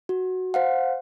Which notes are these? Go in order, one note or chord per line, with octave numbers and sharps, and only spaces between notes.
F#4
C5 F5 F#5